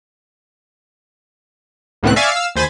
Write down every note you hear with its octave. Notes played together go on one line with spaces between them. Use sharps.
C#2 A2 D#3 B3 C4 F#6
D5 E5 F5 G#5 C#6 A6
F5 E6
D#2 C5 G#5 B5 A6